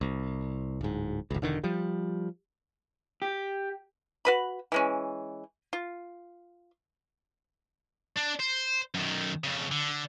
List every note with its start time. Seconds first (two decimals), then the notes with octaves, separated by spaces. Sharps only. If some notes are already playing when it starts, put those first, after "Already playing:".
0.01 C2
0.81 D1 G#2
1.30 G1 C#2
1.42 E1 D3 D#3
1.63 F3 G3
3.22 G4
4.25 F#4 B4 B5
4.72 E3 G#3 C#4
5.73 F4
8.16 D4
8.39 C5
8.94 F#2 D#3
9.44 F2 C#3
9.71 D3